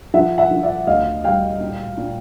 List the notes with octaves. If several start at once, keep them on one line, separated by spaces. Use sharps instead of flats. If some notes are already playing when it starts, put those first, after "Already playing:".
F3 E5 F#5
E5 F#5
F3
D5 E5
D2 D#5 F5
G3 F5 G5
A#2
A#2